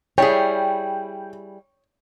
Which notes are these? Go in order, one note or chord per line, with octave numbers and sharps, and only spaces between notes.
G3 E4 G#4 C#5 G5